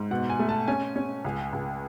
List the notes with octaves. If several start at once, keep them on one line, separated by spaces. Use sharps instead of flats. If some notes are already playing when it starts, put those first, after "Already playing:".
Already playing: G#2
B2 F#5
G#5
A3
A5
C#4 G#5
C#4
C#2
C#2